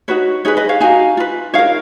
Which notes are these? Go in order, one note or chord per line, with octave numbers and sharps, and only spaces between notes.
D#4 F#4 B4 C#5
D#4 G#4 B4 C#5
B4 D#5
C#5 F5
D#4 F#4 A#4 F5 G#5
F4 B4
D#4 A#4 C#5 F5